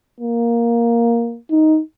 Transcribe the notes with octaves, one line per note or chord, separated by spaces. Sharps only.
A#3
D#4